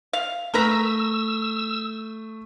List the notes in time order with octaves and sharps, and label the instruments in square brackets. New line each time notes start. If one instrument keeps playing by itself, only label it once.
[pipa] F5
[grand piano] A3 [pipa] A#4 B4 A#5 [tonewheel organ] E6